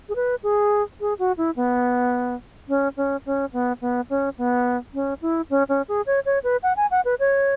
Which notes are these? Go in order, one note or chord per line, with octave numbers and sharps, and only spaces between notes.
G#4
B4
G#4
G#4
F#4
E4
B3
C#4
C#4
C#4
B3
B3
C#4
B3
C#4
E4
C#4
C#4
G#4
C#5
C#5
B4
F#5
G#5
F#5
B4
C#5